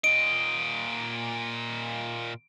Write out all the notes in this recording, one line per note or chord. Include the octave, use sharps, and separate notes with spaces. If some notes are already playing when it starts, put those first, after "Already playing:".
A#2 D#5 D7